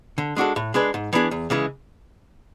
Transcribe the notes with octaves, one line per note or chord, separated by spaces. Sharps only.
D3
G#3 D4 F#4 A4
A2
G#3 D4 G#4 B4
G#2
E3 B3 D4 G#4
E2
C#3 E3 G#3